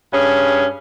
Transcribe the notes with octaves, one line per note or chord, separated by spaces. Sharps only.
G2 C#4 G#4